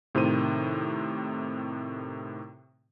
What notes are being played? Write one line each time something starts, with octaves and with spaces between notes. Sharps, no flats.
A2 C3 D#3 C5 D#7